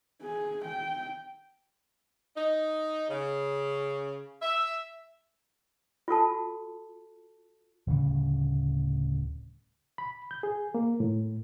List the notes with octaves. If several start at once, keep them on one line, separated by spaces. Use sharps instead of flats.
G#4
G5
D#4
C#3
E5
F4 F#4 A4 A5
D1 D2 C#3 G3
B5
G6
G#4
A#3
A2